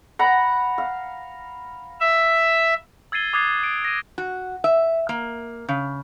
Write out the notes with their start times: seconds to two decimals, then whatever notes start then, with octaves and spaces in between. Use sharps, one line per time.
0.19 F#5 A#5 B5
0.78 F5
2.01 E5
3.12 E6 G#6 A6 C7 D#7 G7
3.33 D6 D#6 F#6 G#6 A6 C7
3.64 D7
3.85 A#6 D#7
4.18 F#4
4.64 E5
5.09 A#3
5.69 C#3